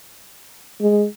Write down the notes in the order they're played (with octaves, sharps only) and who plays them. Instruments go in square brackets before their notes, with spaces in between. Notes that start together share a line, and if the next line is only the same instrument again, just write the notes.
[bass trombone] G#3